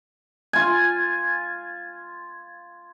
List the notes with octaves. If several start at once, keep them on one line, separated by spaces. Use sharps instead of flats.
F4 G#5